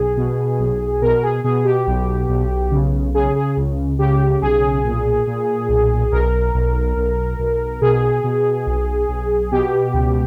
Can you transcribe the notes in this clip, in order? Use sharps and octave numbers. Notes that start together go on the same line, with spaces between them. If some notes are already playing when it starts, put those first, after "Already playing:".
Already playing: B1 G#4
B2
B1
B2 A#4
G#4
B2 G#4
G4
B1
B1
C#3
C#3 G#4
G#4
C#2
C#3 G4
B1 G#4
A#2
A#2
B1
B1 A#4
B1
B1
B1
B2 G#4
B2
B1
B1
B2 G4
C#2